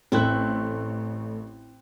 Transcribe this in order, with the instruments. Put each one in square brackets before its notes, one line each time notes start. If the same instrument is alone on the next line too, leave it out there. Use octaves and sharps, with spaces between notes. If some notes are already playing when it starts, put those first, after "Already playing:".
[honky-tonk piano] A1 A3 F#6 [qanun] C4 E4